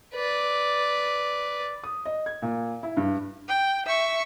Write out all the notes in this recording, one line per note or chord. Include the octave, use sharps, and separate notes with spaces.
B4 D5
D#6
D#5
G#6
A#2
E4
G2
G5
E5 C#6